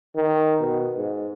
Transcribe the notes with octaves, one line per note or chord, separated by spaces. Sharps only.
D#3
B2
G#2